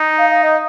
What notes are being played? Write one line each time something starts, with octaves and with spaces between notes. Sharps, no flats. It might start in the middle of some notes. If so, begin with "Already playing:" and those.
Already playing: D#4
F5
F5
D#5